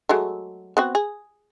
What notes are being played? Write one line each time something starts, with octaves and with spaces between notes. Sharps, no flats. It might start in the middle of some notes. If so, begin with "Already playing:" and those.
F#3 G#3 A3
B3 C4 F#4
G#4